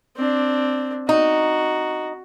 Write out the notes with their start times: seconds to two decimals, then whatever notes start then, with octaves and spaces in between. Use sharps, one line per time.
0.17 C4 D4
1.09 D#4 F#4